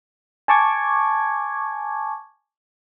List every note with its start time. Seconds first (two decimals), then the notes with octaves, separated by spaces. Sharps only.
0.48 G#5 A5 C#6 D6 G#6